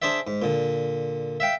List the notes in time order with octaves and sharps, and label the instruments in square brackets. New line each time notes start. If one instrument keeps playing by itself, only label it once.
[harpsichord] D4 G#4 C5 D5 E5
G#2
A#2 D3
E5 F5 G5